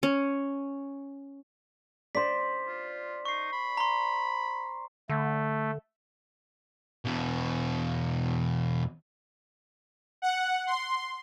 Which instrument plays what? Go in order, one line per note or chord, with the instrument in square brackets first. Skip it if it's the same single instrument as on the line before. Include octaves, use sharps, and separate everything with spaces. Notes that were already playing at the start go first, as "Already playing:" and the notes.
[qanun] C#4
[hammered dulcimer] C5 D5 [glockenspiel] B6
[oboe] F4
[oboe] D#4 [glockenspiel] C#6 C7
[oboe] B5
[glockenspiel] A#5 C6
[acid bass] D3 [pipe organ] A3
[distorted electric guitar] E2 B2
[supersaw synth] F#5
C6